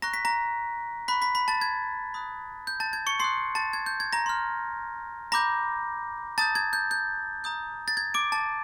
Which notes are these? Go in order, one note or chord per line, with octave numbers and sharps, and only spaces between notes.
A#5 C#6 F#6 A#6
B6
A#5 A#6
B5 C#6 F#6 B6
B5 B6
B5 B6
A5 A6
G#6
B5 D#6 F#6
G6
A5 A6
G#6
C#6 C#7
C6 D#6 F#6 C7
A5 A6
G#6
G6
G#6
A#5 A#6
C6 F6
A#5 B5 D6 G6 A#6
A5 A#5 D#6 G6 A6
G#6
G6
G6
A#5 D#6 G6
A6
G#6
D6 D7
A5 A6